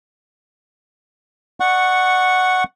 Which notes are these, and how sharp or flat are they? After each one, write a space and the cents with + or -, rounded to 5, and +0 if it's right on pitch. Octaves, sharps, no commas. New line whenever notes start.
D5 +25 F#5 +0 C#6 -5